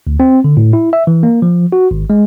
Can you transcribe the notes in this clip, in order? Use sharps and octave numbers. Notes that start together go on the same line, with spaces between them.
D2
C4
D3
A2
E4
E5
E3
A#3
F3
F#4
G#1
G#3